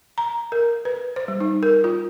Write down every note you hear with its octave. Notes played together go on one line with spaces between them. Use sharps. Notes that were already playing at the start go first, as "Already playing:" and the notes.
A#5
A#4
B4
C5
G3
D#4
A#4
F4